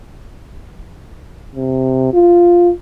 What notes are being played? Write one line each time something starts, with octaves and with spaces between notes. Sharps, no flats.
C3
F4